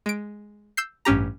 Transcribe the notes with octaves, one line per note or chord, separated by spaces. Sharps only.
G#3 D7
E6 G6 C7
A1 G2 C#4 G4 A#5